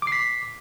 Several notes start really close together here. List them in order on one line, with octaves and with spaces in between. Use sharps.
D6 C7 B6